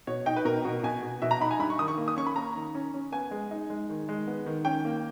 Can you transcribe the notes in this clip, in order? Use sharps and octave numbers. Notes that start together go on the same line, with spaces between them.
B2 C#5
D#4 G5
B4
B2 A#4
B2
B2 G#5
B2
B2 E5
A#5
D#4 B5
G#5
G2 B5
C#6
D#3 D#6
C#6
A#3
D#6
C#4 C#6
B5
A#3 A#5
D#3
C#4
C#4
B3 G#5
G#3
D#4
G#3
D#3
G#3
B3
D#3
C#4 G5
A#3